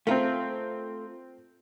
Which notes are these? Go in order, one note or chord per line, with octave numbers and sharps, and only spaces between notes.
A3 C4 F4 A#4